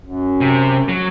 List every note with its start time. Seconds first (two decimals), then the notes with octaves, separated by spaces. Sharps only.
0.05 F#2
0.41 C3
0.89 F#3